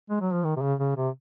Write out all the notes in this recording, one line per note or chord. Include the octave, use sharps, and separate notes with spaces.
G#3
F#3
F3
D#3
C3
C#3
C#3
C3